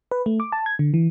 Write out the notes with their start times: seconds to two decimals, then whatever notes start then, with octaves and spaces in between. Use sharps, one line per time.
0.11 B4
0.26 A3
0.40 D6
0.52 A5
0.66 G#6
0.79 D3
0.94 E3